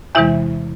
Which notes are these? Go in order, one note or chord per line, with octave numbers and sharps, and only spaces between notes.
E2 C3 E3 G#3 E4 E5